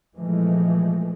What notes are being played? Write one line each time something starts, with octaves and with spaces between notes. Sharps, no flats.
A#2 E3 F3 G#3 A3